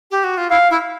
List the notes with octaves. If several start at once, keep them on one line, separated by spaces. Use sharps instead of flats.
G4
F#4
F4
E4 F5
E4